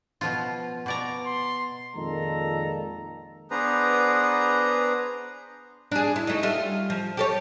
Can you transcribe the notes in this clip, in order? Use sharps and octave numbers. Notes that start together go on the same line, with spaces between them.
B2 F3 F4
B2 D5 A#5
C6
F2 A#2 D#3 G#3 A4 A#5
B3 D4 G#4 B4 C5 A#5
D4 G#4
E4
A3 D#4
G3 F4 E5
F3
G4 A4 C#5